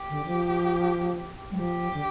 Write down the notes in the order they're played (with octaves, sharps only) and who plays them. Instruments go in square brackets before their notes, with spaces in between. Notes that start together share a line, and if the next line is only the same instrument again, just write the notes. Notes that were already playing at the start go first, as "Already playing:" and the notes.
Already playing: [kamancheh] G4
[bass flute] D3
F3
G3
[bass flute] F3 [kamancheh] G4
[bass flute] D3